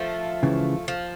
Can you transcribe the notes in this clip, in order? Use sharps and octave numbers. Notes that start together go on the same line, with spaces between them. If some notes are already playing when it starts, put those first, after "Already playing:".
Already playing: F3 A3
C#2 C#3 E3
F3